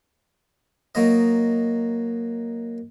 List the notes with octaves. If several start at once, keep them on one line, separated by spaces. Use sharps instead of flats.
F#3 A#3 D#4 D#5